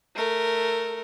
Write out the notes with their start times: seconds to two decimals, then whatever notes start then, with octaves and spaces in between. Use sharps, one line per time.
0.15 A3 A#4